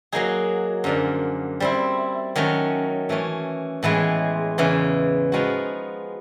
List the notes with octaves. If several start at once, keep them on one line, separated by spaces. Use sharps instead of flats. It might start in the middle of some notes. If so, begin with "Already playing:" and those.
F#3 A#3 D#4 G#4
F#2 D3 F3 A#3
G3 C4 E4
D#3 F#3 A3 C#4
E3 A3 C#4
A2 E3 G#3 B3
E2 C#3 E3
F3 G#3 B3 D#4 F#4